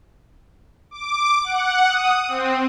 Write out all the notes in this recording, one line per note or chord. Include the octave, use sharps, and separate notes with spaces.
D6
F#5
D#6
C4